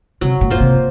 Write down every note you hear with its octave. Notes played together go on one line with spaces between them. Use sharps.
C3 F#3
A#2
A#3 F4 C5
C3